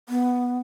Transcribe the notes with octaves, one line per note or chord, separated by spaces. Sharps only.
B3